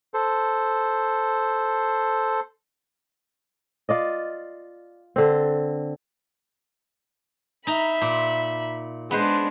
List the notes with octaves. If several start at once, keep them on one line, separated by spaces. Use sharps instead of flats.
A4 C5
F4 D5 D#5
D3 C4
D#4 E5 A#5 B5
A#2
G#3 B3 D4 B4 C5